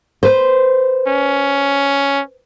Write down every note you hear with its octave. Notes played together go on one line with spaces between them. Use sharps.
B4 C5
C#4